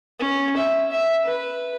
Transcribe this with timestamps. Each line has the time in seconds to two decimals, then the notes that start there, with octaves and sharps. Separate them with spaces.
0.20 C#4
0.57 E5
0.91 E5
1.24 B4